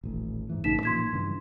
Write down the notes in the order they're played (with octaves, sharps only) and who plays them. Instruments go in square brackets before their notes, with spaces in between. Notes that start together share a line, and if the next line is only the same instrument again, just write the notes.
[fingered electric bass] D#1 A1
G#2 E3
[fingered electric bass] A1 G2 C#3 [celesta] D#4 B6 E7
[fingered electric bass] A#2 E3 F3 [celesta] C6 G#6 B6
[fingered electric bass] G2 C#3 E3